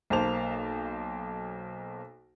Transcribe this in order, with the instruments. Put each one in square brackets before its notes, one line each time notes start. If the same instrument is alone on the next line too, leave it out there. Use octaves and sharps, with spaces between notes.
[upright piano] B1 A#3 C5 A5 F7